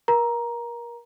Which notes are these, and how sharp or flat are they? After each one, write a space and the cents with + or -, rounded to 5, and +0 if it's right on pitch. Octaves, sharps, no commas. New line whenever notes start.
A#4 +30 A#5 +10